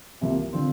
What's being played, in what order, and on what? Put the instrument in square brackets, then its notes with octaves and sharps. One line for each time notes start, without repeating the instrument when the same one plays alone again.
[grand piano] C2 C3 F3 A#3 E4
D3 F3 C4 F4